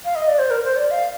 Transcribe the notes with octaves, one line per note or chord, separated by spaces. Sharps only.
F5
D#5
D5
C5
A#4
C5
D5
F5